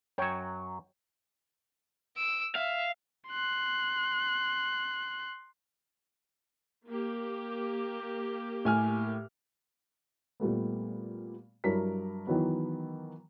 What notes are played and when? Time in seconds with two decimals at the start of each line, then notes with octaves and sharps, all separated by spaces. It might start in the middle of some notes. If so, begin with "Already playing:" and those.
0.18 F#2 F#3 C#5 G5
2.17 E6 D7
2.55 E5 F5
3.29 C6 F#6
6.88 A#3 G4
8.65 A2 G#5 F6
10.40 A#2 G3 A3 B3
11.64 G2 F#3 E4 A#4 B6
12.27 D#3 E3 F#3 B3